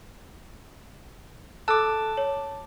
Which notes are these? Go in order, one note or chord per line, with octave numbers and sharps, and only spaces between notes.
A4 A5 D6 E6 F#6
C#5